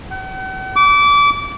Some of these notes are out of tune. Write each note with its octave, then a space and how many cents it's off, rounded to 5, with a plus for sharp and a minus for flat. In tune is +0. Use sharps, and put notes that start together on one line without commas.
F#5 +45
D6 -25